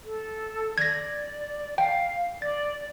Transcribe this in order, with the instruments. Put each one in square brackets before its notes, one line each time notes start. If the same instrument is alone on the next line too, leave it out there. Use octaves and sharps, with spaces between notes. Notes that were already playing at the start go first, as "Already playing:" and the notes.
[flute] A4
[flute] D5 [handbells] G#6 A#6
[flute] F5 [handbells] G5
[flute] D5 [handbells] A6